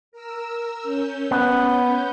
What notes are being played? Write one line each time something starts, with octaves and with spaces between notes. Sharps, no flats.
A#4 E6
C#4 G6
B3